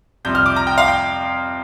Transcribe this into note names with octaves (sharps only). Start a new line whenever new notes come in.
F2 C3 G3 G6
F6
D6
A#5
G5
F5
G5